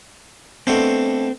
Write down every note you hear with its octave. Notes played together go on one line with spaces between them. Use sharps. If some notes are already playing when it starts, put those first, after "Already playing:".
B2 A3 C4 D4